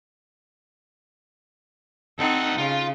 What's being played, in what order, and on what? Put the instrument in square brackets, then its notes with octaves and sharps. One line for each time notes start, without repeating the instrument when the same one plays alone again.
[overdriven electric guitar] D2 F#5 [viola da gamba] C4 D#4 A4
[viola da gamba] C#3 [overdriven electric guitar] F4